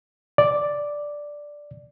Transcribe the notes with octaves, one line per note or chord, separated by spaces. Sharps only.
D5